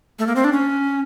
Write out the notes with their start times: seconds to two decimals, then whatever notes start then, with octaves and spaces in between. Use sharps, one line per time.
0.19 A3
0.27 A#3
0.36 C4
0.44 D4
0.53 C#4